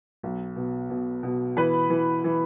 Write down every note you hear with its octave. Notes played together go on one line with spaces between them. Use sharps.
B1
B2
B2
B2
E3 B4 B5
E3
E3